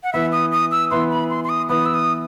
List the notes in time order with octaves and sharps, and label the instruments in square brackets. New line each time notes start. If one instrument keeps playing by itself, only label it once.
[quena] F#5
[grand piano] E3 B3 E4 B4 [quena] E5
[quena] D#6
D#6
E6
[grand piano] E3 B3 E4 B4 [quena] C6
[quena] B5
C6
C6
D#6
[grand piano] E3 B3 E4 B4 [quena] D#6
[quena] E6
D#6